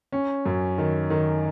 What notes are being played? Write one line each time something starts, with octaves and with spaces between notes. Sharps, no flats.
C#4
F#2
D#3
D#3